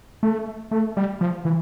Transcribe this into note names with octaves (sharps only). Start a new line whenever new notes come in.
A3
A3
G3
F3
E3